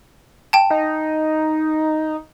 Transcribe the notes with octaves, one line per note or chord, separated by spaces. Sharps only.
G5 A5
D#4